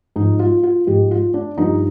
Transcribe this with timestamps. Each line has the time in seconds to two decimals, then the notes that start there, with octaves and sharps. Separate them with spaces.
0.16 G#2 F3 D#4
0.39 F4
0.63 F4
0.87 G#2 F3 G4
1.11 F4
1.34 D4
1.58 G2 F3 D#4